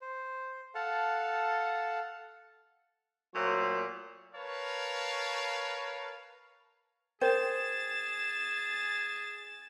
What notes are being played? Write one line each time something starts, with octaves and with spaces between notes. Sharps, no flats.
C5
A4 F5 F#5 A5
A#2 F#3 A3 C5
A#4 B4 C#5 F5 A5
G#4 A#4 C5 G5 A6 E7